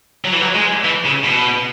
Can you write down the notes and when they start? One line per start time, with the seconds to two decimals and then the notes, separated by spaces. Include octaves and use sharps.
0.25 F#3
0.33 E3
0.41 F#3
0.55 G#3
0.84 E3
1.05 C#3
1.23 B2